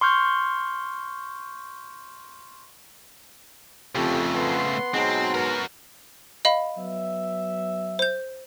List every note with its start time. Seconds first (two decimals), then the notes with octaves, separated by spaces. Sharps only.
0.01 C6 C#6 F6 G6
3.95 F2 C#3 A3 G4
4.35 B3 F#5 C6
4.94 G#2 B2 F#3 G#3 C4
5.34 B3 F#4 A#4
6.45 D#5 F5 B5
6.77 F#3 B3 E5
7.99 C5 G6